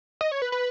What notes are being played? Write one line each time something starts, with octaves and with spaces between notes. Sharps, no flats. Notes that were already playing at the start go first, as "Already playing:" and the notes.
D#5
C#5
B4
B4